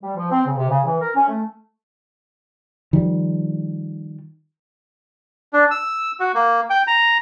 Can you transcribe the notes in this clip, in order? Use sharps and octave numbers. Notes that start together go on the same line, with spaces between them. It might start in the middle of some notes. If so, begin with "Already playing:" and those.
G3
F3
C4
C#3
C3
C#3
E3
A#4
C#4
A3
D#3 F3 G3
D4
E6
F#4
A#3
G5
A#5